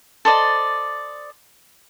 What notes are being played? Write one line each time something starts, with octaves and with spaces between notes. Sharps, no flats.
A4 C5 D5 D#5